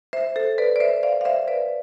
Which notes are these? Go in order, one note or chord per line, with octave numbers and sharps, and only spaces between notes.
C5 E5
A4 C5
B4 D5
D5
C5 E5
D5 F5
F5
C5 E5
B4 D5